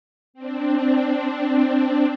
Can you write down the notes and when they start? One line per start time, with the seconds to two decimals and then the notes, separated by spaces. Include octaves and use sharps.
0.34 C4 D4